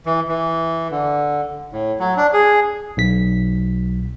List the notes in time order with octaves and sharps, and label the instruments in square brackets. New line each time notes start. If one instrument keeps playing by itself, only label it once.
[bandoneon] E3
E3
D3
A2
F#3
D4
G#4
[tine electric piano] B1 B6